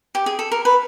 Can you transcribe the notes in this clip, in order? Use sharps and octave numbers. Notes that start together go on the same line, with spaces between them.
G4
G#4
A4
A#4
B4